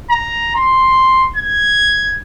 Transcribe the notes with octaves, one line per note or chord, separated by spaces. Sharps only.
A#5
C6
G#6